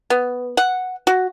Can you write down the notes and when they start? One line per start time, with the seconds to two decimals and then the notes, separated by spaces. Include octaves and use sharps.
0.10 B3
0.57 F#5
1.07 F#4